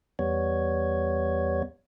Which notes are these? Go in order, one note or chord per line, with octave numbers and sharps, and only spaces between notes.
E2 G3 B3 C#5